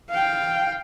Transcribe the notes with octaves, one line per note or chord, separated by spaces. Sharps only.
F5 G5